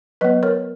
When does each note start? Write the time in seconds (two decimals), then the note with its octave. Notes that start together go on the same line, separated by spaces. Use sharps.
0.21 F#3 B3 B4 D#5
0.43 A#4 C#5